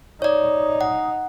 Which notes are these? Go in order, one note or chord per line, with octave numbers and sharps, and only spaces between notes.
D#4 C#5 D5
F#5